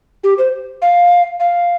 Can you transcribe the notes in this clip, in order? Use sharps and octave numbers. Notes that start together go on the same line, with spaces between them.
G4
C5
F5
F5